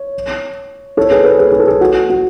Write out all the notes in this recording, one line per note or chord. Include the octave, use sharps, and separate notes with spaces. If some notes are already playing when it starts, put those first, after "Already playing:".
Already playing: C#5
A4 C#5
G#4 B4
G#4 B4
G#4 B4
G#4
A4
G#4
F#4
F#4